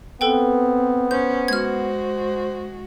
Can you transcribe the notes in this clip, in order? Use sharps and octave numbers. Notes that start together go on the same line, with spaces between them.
B3 C4 A4 B4 G5
C#4 C5 G6
G#3 F#4 F6 G#6